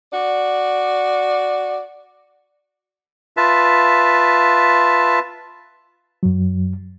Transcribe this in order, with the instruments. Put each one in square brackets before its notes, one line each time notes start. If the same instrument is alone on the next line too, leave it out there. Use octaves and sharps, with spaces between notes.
[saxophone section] F#4 D5
[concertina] F4 B4 E5 A5
[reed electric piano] F#2 F#3